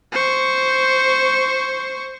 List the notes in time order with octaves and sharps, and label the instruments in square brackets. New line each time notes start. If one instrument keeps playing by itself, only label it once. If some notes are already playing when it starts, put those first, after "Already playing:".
[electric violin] C5 C#6